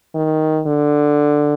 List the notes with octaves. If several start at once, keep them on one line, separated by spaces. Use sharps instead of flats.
D#3
D3